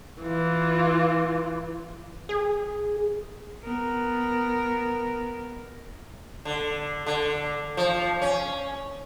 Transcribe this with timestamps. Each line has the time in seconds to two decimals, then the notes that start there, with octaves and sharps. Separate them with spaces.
0.22 E3 F4
2.29 G#4
3.62 B3 A#4
6.45 D3
7.06 D3
7.77 F3
8.22 C#4